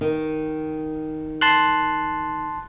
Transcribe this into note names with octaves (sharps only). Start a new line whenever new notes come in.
D#3
A5 C6 F#6